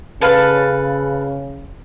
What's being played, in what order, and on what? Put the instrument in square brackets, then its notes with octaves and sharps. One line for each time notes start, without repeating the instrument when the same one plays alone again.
[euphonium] C#3 [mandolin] A4 B4 F5